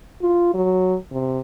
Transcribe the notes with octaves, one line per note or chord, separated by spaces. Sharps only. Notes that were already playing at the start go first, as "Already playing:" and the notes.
F4
F#3
C3